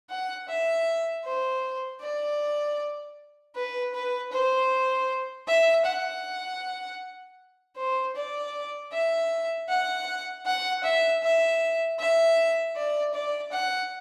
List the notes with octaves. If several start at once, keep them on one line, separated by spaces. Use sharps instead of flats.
F#5
E5
C5
D5
B4
B4
C5
E5
F#5
C5
D5
E5
F#5
F#5
E5
E5
E5
D5
D5
F#5